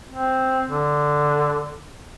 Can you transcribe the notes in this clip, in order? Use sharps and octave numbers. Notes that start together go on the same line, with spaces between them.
C4
D3